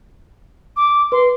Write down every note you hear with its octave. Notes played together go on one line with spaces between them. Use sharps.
D6
B4 C6